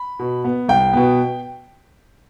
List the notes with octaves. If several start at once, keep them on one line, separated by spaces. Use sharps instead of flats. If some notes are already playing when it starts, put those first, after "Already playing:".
Already playing: B5
B2
B3
C2 G5
B2 B3